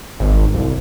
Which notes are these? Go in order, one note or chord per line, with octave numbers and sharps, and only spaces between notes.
G#1
C2